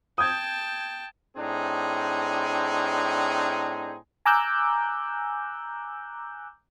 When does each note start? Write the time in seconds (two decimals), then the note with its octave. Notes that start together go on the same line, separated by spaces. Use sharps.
0.18 G5 A5 D#6 G6 G#6
1.37 A2 C4 D4 D#4 G#4
4.25 G#5 A#5 D6 E6 F#6 G6